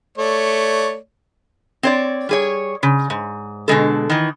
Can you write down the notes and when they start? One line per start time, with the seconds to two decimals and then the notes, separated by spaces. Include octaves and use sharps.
0.18 A3 C#5 D5
1.83 C4 C#5 D5
2.29 G3 G#4 C#5
2.83 C#3
3.10 G#2
3.68 B2 D3 G#3 A4
4.10 D#3 E3